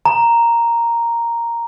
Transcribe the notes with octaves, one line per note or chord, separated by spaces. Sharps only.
A#5